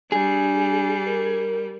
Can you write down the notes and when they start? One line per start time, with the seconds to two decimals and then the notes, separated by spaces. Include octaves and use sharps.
0.12 G3 D4 G#4
1.07 A#4